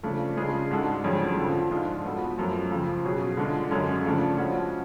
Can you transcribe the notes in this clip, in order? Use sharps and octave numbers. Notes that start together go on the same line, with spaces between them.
C#3 F3 A3 D4
C#3 G#3 D4 F4 G#4
G#2 G#3 D4 F#4 A4
F2 D3 F#3 C#4 G#4
F2 D3 F3
G#2 F3 G#3 D4 F4
F3 B3 F#4 A4
F#2 F3 A3
F2 C#3 F3
B2 F#3 C#4 G#4
D3 G#3 D4 F4
F#2 D3 G#3 C#4
F2 C#3 F3 A3 D4
F3 G#3 C#4 F#4